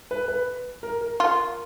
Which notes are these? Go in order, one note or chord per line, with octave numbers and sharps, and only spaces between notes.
B4
B4
A#4
A#4
F4